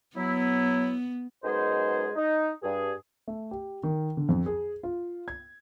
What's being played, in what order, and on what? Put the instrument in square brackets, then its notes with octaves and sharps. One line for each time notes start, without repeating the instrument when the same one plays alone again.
[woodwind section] F#3 E4 [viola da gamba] B3
[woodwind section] F#2 G#3 B3 D#4 G#4 C5
D#4
G2 G#4
[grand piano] A3
G4
D#3
D3
F2
G#4
F4
G#6